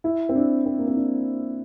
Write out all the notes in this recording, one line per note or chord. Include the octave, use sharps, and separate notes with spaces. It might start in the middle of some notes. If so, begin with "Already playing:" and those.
E4
C4
D4
C4
A#3
C4
D4